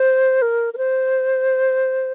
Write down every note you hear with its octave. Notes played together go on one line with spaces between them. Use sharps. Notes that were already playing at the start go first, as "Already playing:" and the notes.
Already playing: C5
A#4
A#4
C5